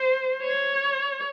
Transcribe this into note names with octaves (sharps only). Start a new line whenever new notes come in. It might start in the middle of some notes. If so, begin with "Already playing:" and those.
Already playing: C5
C#5